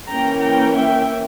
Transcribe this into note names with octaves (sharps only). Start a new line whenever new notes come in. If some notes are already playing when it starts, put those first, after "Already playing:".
E3 A#3 C#4 G5 A#5
G5 A#5
E5 G5